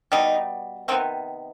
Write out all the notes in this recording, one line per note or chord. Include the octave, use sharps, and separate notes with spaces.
B2 G3 B3 D#4
C3 D#3 B3 C4